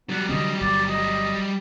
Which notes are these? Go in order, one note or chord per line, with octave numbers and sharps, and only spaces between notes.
F#3 G3 B3
D3 E3 C4 D#5
G1 D5
D#5